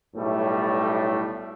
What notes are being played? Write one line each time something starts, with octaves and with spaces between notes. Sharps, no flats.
B1 A2 G3 A3